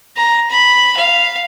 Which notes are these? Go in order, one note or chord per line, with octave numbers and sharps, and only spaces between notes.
A#5
B5
F5